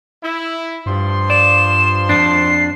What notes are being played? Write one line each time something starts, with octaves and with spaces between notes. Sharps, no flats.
E4
G2 F3 C6
D5 E7
F2 D4 C7